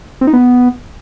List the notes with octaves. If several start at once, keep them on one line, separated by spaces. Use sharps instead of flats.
C4
D#4
B3